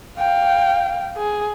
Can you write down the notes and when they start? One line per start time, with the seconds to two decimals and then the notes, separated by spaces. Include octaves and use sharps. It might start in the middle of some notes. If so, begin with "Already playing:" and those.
0.18 F5 G5
1.17 G#4